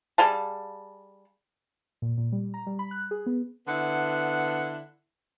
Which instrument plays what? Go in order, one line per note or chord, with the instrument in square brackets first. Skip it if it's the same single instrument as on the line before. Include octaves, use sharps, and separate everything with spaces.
[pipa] G3 G#4 F5 A5
[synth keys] A#2
A#2
G3
A#5
G3
B5
F#6
G#4
B3
[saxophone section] D3 B3 E4 F#5